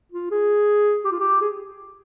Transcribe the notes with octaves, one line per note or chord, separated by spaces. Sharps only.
F4
G#4
G4
F4
G4
G#4